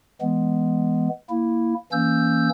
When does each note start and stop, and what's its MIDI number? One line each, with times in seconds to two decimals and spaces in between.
0.21 1.09 52
0.21 1.09 56
0.21 1.09 59
1.30 1.74 58
1.30 1.74 64
1.92 2.49 52
1.92 2.49 58
1.92 2.49 61
1.92 2.49 88
1.92 2.49 91